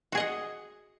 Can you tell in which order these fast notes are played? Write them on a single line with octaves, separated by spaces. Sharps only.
F#4 G#4 D#5 F#5